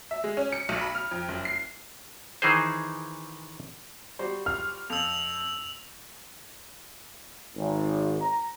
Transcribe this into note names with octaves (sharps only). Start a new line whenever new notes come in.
E5
G#3
C#4
C#7
B1
B5
F6
F2
F#1
C7
D#3 E3 D#4 G#4 C5
G3 F#4 C5
F6
F2 E6 F7
G#1
A#5